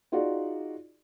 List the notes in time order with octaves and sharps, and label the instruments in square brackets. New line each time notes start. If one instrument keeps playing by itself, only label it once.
[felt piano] D#4 F4 F#4 G#4 D5